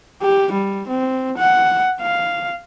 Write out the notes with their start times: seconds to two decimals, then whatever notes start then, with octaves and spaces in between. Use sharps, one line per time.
0.22 G4
0.52 G3
0.88 C4
1.38 F#5
2.02 F5